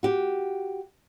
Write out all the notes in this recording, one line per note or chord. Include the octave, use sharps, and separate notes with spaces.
F#4 G4